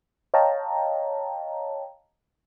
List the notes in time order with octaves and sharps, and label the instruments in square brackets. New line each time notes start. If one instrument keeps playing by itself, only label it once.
[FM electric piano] C#5 D#5 F5 G5 A5 A#5